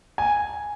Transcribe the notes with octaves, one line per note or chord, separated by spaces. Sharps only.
G#5